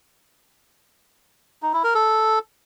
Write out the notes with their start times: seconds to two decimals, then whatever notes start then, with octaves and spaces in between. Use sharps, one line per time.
1.63 D#4
1.73 E4
1.84 A#4
1.95 A4